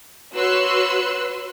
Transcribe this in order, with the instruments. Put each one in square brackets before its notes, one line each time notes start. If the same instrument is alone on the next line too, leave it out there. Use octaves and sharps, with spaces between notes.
[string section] F#4 B4 C#5 C6 E6 F#6